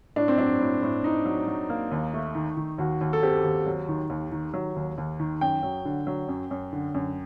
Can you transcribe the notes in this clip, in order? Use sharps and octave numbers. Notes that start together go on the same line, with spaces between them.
A2 D4
C4
F#3 D4
A2
A2
A2 D#4
F#3
F#3
A#3
D#2
A3
D#3
D#3
D#2 F#4
D#2
A4
C4 G4
D#2
F#3
D#3
D#2
D#3
F#3
D#2
D#2
D#3
F#2 G5
F#3
D3
F#3
F#2
F#2
D3
F#2